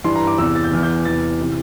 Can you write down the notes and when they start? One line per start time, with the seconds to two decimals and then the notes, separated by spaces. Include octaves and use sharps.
0.04 G2 E3 C6
0.16 A#5
0.27 D6
0.38 E2 C3 E3 E6
0.55 A6
0.64 G6
0.72 E2 E3 F6
0.83 G6
1.05 E2 C3 E3 A6
1.41 C3 E3